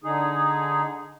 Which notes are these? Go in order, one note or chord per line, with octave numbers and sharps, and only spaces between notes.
D3 D#4 G#4